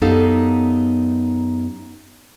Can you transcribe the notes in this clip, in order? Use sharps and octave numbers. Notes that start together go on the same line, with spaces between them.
F#2 B3 D#4 G4 A4 F5